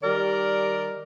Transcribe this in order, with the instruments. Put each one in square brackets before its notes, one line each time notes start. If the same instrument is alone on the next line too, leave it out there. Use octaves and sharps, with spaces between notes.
[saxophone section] D#3 G3 A#4 D5